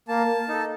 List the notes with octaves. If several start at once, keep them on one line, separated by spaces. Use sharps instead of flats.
A#3 A5
D#4 A4